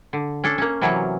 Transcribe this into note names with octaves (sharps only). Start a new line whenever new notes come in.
D3
C#4 D4 A4
A#3 C#4
C3 E3 F#3 C#4